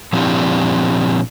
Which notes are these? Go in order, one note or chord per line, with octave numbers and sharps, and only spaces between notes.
A#2 F3 C4 D4 E4 G4